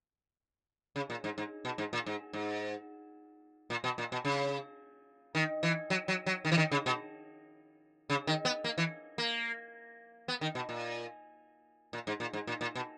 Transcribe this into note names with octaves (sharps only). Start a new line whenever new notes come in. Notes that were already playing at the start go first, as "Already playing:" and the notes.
C#3
A#2
G#2
G#2
B2
G#2
A#2
G#2
G#2
A#2
B2
A#2
B2
C#3
D#3
E3
F#3
F#3
F#3
D#3
E3
D#3
C#3
B2
C#3
D#3
B3
A#3
E3
A#3
B3
D#3
B2
A#2
A#2
G#2
A#2
G#2
A#2
A#2
B2